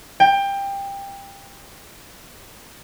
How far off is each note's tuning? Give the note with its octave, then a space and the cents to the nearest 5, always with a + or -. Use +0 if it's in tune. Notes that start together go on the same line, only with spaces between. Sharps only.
G5 +20